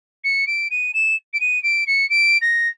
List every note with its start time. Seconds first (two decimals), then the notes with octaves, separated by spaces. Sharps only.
0.24 C#7
0.47 D7
0.70 D#7
0.93 E7
1.33 D7
1.40 D#7
1.63 D7
1.86 C#7
2.09 D7
2.41 A#6